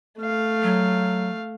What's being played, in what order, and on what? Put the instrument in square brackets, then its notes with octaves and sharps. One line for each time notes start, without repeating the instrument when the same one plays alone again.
[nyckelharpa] A3 F5
[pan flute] F#3